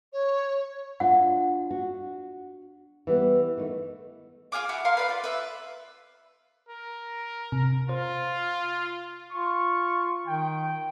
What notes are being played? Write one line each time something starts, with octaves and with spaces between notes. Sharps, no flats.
C#5
D4 F4 F#5
F#4
E3 G3 B3
D#3 A3
F4 G#4 F5 D6
E4 F#4
A#4 F5 C6
B4 D5 F5
F4
B4 E5
A#4
C3
F4 C5
F4 C#6
D#3 G5